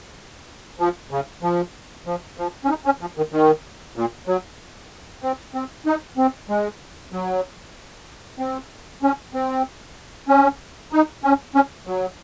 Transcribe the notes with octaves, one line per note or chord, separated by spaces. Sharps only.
F3
C#3
F3
F3
F3
C#4
D#4
C#4
F3
D#3
D#3
A#2
F#3
C4
C4
D#4
C4
G#3
F#3
C4
C#4
C4
C#4
D#4
C#4
C#4
F#3